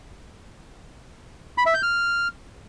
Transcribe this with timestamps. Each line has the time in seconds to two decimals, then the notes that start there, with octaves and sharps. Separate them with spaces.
1.58 B5
1.66 E5
1.74 G6
1.83 F6